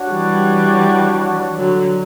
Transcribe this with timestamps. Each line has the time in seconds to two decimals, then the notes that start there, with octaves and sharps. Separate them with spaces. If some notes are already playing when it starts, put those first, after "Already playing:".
Already playing: D4 F#4 C#5 F#5
0.10 E3 G3
1.58 D3 F#3